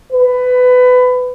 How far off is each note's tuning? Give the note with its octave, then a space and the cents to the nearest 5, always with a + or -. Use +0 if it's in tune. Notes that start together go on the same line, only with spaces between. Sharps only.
B4 +20